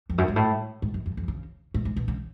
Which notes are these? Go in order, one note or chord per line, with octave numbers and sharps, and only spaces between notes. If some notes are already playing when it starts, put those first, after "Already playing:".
F2
F#2
G#2
A2
G#2
F#2
F2
F2
C#3
A2
G#2
B2
C#3